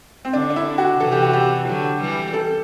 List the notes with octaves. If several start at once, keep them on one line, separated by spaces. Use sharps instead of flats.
C4
D3 D4
D4
E4
F#4
C3 E3 A4
G4
F#4
G4
D3 F#3
E3 G3
A4